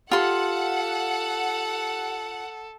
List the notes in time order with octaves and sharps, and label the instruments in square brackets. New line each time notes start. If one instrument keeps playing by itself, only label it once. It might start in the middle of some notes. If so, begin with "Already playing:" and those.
[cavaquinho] F4 C6 [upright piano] G4 [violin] A4 [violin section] F#5